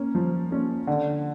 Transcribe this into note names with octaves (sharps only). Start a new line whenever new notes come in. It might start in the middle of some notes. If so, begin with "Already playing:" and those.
Already playing: A#3 C#4
F3
A#3 C#4
D3